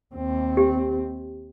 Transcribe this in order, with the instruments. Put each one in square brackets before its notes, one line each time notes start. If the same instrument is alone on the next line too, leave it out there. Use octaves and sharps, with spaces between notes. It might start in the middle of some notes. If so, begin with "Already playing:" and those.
[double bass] D#2 C4
[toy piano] G4